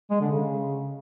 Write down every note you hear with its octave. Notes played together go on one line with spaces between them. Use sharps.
G#3
D3
C#3